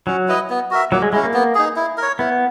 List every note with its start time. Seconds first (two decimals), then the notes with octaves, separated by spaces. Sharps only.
0.07 F#3 C#4
0.28 E4 B4 D#5
0.50 B3
0.71 F#4 A#4 E5
0.92 F#3 A#3
1.02 G#3
1.13 G#3 E4
1.16 C#4
1.24 A#3
1.33 B3
1.55 D#4 G#4
1.76 E4
1.97 A#4 C#5
2.19 B3 E4